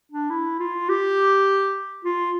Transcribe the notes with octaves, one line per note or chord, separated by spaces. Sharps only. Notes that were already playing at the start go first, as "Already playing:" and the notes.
D4
E4
F4
G4
F4